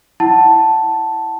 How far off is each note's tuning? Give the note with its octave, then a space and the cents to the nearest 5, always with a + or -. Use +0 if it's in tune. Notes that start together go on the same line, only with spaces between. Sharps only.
E4 +0 F#5 +25 A5 +0